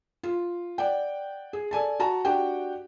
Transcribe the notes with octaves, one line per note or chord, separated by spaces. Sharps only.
F4
D5 F#5 G5
G#4
A4 D5 G#5 A5
F#4 A5 A#5
D4 F#4 G4 F#5 G5